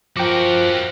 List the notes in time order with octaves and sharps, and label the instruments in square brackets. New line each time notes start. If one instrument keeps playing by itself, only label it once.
[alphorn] F3 [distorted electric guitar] F#4 A#4 [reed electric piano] G5 D6